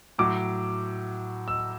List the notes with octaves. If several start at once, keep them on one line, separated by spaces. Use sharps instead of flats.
A2 F#3 D6
E6